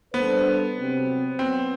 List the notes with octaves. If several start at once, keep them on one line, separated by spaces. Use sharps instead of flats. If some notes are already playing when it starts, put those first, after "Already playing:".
G3 B3 D4 A4 C5
C3 F#3 C4
F#2 F#3 B3 C4